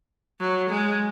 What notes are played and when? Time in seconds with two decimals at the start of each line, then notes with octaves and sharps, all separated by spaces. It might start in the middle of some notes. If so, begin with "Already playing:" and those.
0.40 F#3
0.69 G#3